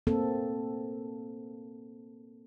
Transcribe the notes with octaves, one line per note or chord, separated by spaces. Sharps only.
A#3 C4 A4